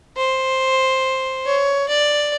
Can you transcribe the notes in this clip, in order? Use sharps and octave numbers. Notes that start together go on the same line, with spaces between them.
C5
C#5
D5